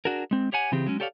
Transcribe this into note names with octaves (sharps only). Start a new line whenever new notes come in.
D4 F#4 G#4 A#4
G#3 C4
G4 C#5 F#5 G#5
C#3 E3 C4 G4 G#4
F#3 G#3 C#4
G4 A4 C#5 D5 F5